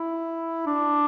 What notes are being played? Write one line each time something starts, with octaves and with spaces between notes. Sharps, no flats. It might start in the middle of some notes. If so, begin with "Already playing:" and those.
Already playing: E4
D4